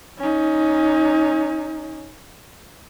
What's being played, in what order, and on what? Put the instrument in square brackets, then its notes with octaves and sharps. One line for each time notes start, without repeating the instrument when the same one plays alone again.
[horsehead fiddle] C#4 D#4